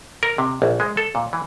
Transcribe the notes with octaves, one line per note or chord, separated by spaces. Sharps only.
A#4
C3
A#1
G#3
A4
A#2
E3